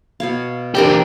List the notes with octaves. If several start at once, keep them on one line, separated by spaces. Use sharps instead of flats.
B2 C#5 F5
E2 C4 D4 G4 A#4